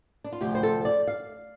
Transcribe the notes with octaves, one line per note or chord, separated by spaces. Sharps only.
D4
F4
D2 C3 F3 G4
C5
A4
D5
F5